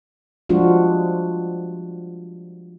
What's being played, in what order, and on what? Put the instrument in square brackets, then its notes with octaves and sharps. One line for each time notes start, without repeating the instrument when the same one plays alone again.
[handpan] F3 G3 G#3 D4 F4 F#4